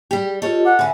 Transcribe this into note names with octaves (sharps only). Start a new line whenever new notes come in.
G3 G4
F4 G4 A4 C#5 D#5
F#5 D6
D3 B4 E5 G#5